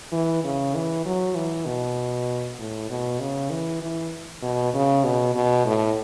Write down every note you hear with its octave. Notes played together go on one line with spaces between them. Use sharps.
E3
C#3
E3
F#3
E3
B2
A2
B2
C#3
E3
E3
B2
C#3
B2
B2
A2